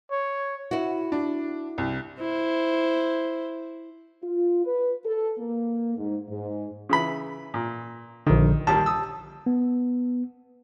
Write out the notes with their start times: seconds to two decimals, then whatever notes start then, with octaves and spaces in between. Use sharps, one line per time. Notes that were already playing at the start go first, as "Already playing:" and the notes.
0.11 C#5
0.71 E4 F#4
1.12 D4
1.78 C2
2.20 E4 C5
4.22 F4
4.65 B4
5.04 A4
5.39 A#3
5.97 G#2
6.28 G#2
6.89 C#3 E3 B5
7.54 A#2
8.27 A#1 D3 D#3
8.67 D#2 G3 A#3 A5
8.86 D#6 E6
9.46 B3